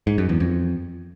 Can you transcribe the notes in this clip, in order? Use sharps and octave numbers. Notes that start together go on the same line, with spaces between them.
G#2
F#2
E2
F2